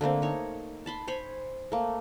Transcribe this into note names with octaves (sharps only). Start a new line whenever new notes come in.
D3 A3 A#3 C4
D#4 C#5
A5 B5 C6
C5 C#5 G#5 B5
A3 A#3